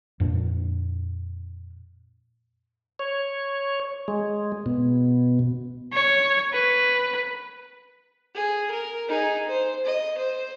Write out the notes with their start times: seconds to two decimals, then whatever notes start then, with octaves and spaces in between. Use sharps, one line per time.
0.20 F2 A#2 D4
2.99 C#5
4.08 G#3
4.66 B2
5.93 C#5
6.53 B4
8.35 G#4
8.70 A#4
9.08 D#4 G#4
9.48 C5
9.86 D#5
10.17 C5